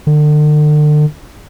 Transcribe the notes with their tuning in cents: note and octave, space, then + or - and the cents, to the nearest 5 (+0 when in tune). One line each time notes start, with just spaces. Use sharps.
D3 +40